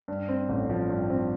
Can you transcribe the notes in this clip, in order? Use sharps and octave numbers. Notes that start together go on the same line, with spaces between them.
G2
C4
A1
F3
G2
C4